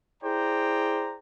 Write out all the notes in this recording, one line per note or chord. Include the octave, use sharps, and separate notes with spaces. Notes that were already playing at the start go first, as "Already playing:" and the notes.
E4 G#4 C5 D5 G5 A#5